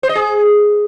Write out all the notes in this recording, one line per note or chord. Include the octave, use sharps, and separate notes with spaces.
C5
D#5
G#4